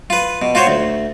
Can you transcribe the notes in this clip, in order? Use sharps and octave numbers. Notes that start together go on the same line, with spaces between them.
F4 B4
B2
F4 F#4 C5 C#5
D2